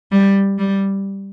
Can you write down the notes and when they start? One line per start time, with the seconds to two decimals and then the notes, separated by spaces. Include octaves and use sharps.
0.12 G3
0.58 G3